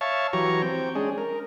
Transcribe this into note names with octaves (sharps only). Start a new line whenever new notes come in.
C#5 E5 F5 A5 C#6
E3 F#3 G4 C#5 A#5 C#6
C4 G5
G#3 C#4 D4 G#4
A#4